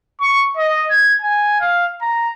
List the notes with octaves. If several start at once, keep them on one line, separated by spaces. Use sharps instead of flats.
C#6
D#5
G#6
G#5
F5
A#5